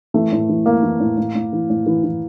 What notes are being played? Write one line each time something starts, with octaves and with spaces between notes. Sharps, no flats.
E3 A3
A2
E3
E3 A#3
E3
A2
A2
A2
E3
A2
E3
E3